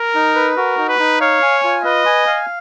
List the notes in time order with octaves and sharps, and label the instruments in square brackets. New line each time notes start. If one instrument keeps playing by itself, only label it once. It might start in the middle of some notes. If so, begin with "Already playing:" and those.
Already playing: [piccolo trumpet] A#4
[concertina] D#4
B4
[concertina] F#4 [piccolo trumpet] A#4
[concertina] D#4
[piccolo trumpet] B4
[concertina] D#4
[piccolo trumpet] C#5 [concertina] F5
[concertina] G#5
F4
[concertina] B4 [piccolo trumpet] D#5
[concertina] G#5
F5